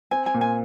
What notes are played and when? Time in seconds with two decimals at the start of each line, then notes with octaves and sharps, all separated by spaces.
0.11 C4 G#5
0.26 G#5
0.34 A#2
0.41 G#5